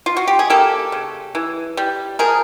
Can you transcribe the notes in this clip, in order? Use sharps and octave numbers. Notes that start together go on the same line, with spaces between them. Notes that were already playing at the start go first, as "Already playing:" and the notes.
F4
F#4
G4
G#4
A#3 G4 A4
C#3
E3
G3
F3 G#4 A#4